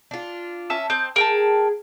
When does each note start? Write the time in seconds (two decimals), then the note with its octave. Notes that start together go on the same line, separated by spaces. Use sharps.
0.11 D4 F4
0.70 C#4 E5 A5
0.90 C4 D#5 G6
1.16 G#4 A#4 G5 A5